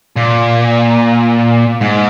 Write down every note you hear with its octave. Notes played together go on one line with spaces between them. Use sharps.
A#2
G#2